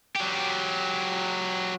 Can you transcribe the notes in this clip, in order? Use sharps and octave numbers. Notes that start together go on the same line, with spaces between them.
F#3 G4